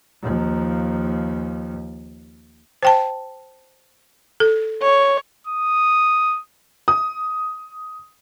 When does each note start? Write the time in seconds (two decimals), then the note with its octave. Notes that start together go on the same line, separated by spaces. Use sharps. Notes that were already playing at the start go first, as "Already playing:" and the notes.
0.22 D#2 F3
2.83 C5 G5 A5
4.40 A4
4.82 C#5
5.47 D#6
6.88 D#6